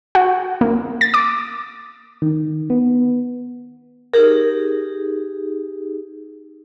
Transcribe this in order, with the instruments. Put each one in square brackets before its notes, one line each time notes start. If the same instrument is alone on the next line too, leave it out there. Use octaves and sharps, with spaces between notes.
[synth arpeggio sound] F#4
A#3
A6
D6
[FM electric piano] D#3
B3
[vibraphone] D#4 G4 G#4 [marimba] A#4